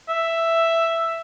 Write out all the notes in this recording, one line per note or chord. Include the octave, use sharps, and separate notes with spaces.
E5